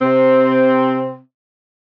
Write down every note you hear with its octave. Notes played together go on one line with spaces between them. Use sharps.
C3 C4